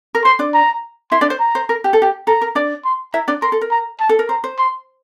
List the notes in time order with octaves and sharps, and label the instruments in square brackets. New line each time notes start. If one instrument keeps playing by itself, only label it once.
[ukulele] A#4
[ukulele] C5 [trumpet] C6
[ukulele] D4 D5
[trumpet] A#5
[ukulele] E4 E5 [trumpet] C6
[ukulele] D4 D5
C5
[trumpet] A#5
[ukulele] C5
A#4
G4
A4
G4
[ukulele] A4 [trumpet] A#5
[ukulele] A#4
D4 D5
[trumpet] C6
[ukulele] E4 E5 [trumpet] A#5
[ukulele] D4 D5
[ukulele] A#4 [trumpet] C6
[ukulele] A4
A#4
[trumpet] A#5
A5
[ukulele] A4
A#4
[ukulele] C5 [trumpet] A#5
[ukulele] C5
[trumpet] C6